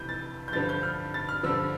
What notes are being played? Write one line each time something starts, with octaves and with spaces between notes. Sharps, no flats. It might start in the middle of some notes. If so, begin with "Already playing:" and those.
Already playing: F2 C3 E3 G6
A6
G6
G2 D3 F3 A6
G6
F6
A6
F6
G2 D3 F3 E6